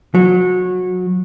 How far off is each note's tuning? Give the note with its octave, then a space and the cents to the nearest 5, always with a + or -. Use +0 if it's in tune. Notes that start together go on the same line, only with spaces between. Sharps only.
F#3 -25